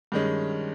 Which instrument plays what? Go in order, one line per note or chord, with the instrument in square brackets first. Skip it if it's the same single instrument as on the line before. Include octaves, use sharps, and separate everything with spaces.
[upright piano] G2 D#3 G#3 C#4